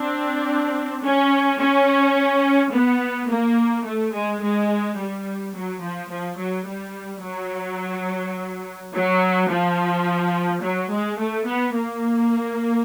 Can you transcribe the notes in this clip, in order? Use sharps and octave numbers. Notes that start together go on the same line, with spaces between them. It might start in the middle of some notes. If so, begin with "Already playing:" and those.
Already playing: C4 D4
C#4
C#4
B3
A#3
A3
G#3
G#3
G3
F#3
F3
F3
F#3
G3
F#3
F#3
F3
F#3
G#3
A3
B3
A#3